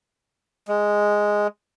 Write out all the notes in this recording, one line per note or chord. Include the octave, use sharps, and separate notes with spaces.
G#3